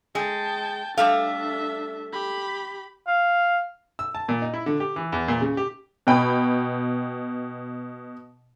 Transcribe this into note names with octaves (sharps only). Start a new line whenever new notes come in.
G#3 G5 A5
G3 A3 D4 E5 F5
G4 B5
F5
E6
A5
A#2
D#4
E4
D3
G4
E3
E2
A#2
C#3
G4
B2 G5 B5